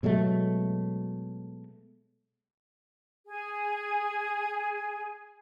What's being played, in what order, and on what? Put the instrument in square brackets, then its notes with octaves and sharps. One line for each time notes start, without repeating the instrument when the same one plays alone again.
[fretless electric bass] B2 F#3 G#3 A3
[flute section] G#4 G#5